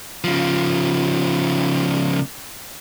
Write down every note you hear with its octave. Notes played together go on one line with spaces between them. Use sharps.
C#3 F3